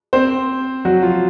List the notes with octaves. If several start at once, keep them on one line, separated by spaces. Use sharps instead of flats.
C4 C5
F#3 F#4
F3 F4